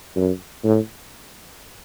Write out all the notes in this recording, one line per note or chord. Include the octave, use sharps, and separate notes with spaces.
F#2
A2